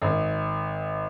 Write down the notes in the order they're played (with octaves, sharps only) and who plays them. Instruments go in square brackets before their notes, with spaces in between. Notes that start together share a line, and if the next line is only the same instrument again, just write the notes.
[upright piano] G#1